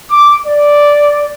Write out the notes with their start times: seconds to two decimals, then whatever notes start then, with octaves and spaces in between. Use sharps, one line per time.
0.11 D6
0.46 D5